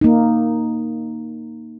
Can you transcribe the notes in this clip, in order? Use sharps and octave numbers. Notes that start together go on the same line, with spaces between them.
A#3 D#4